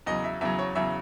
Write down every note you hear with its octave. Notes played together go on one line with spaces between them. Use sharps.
E2 C#3 F#3 D#5
E5
E2 C#3 F#3 E5
C#5
E2 C#3 F#3 E5